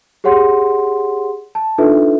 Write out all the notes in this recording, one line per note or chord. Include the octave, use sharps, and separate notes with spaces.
G4 G#4 C#5 F#5 C6
A5
D4 D#4 F4 A4 B4 E5